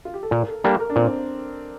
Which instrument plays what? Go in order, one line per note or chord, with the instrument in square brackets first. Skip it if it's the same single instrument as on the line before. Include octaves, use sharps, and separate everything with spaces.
[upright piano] F4
G4
A4
[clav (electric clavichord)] A#2 [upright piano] A#4
[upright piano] A4
[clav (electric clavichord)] G3 A#3 D4 [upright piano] A#4
[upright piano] A#4
D4
[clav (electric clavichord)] A#2 [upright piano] C4